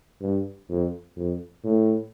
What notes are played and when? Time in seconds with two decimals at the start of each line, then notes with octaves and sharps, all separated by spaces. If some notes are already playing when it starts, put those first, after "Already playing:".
0.21 G2
0.69 F2
1.16 F2
1.64 A2